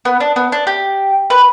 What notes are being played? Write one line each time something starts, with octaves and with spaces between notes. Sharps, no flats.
B3
D4
B3
D4
G4
B4